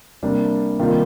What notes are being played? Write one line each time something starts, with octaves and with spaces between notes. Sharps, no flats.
C3 G3 A#3 D4
C3 D#3 G3 A#3 F4